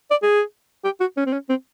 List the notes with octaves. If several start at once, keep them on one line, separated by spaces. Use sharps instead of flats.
D5
G#4
G4
F#4
C#4
C4
C#4
C4